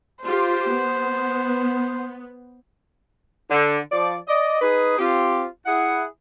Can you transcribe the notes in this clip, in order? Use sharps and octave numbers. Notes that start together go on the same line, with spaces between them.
F4 G4 C5
B3
D3
F3 D5
D5 D#5
D#4 G#4 B4
C4 F4 G4
E4 G#4 F#5